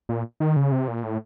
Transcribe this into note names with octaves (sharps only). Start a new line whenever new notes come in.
A#2
D#3
C#3
C3
A#2
A2